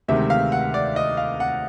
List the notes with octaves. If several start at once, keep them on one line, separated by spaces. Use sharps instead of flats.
D2 C3 D#3 G#3 E5
F5
F#5
D5
D#5
F5
F#5